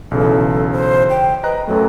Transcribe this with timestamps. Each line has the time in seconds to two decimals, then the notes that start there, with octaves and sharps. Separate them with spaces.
0.11 B1 C#3 E3 A4
0.72 C5
1.10 G5
1.43 B4 D#5 A#5 F#6
1.67 F#2 F#3 A3 A4